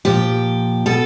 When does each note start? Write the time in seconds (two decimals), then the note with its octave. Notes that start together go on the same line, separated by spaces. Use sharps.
0.05 A#2 F3 G4
0.86 B2 A4